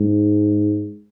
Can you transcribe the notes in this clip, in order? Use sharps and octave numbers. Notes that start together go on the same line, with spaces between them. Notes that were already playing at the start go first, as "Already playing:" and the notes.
Already playing: G#2